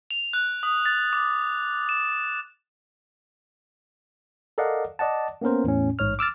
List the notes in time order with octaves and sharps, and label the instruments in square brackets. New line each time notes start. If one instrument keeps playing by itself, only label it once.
[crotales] F7
F#6
D#6
A6
D6
E7
[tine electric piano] A4 A#4 D5 D#5 F5 F#5
D5 D#5 F#5 A5
A#3 B3 C#4 A#4 C5
E2 A2 C#4
A1 G#2 C#5 F6
D6 E6 F6 A6